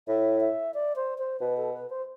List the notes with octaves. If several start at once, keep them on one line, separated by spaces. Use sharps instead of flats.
A2 E5
E5
D5
C5
C5
B2 B4
A4
B4
C5